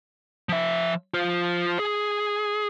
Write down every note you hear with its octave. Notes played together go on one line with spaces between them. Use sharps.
F3 E5
F4 C5
G#4